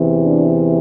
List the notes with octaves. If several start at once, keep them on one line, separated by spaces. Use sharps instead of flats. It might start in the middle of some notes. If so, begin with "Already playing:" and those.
Already playing: E2 C3 E3
D4